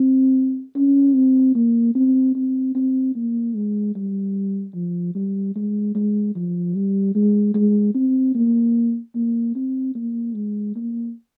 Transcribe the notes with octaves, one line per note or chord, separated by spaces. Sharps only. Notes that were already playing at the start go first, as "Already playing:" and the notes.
Already playing: C4
C#4
C4
A#3
C4
C4
C4
A#3
G#3
G3
F3
G3
G#3
G#3
F3
G3
G#3
G#3
C4
A#3
A#3
C4
A#3
G#3
A#3